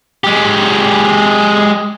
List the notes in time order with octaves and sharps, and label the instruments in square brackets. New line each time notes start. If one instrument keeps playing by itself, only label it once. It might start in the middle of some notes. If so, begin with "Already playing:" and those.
[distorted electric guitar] G#3 G4